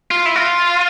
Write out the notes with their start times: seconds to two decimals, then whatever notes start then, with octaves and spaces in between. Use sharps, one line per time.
0.11 F4
0.26 E4
0.36 F4